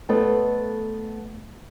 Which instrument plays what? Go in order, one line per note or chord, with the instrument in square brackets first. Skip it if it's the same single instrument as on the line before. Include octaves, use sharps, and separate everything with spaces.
[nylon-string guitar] A3 B3 A4 B4 C5 D#5